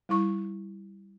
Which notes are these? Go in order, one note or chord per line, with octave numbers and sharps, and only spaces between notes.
G3 E4 C#6